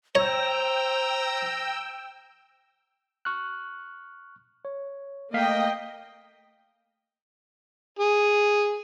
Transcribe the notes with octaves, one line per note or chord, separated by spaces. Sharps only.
C5 C#5 G5 A#5 E6
C#6 F6 F#6
C#5
A3 A#3 D#5 F5 G5 B6
G#4